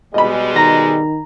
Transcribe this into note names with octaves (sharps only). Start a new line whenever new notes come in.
B2 G3 G#3 D#5 B5
D#3 A#5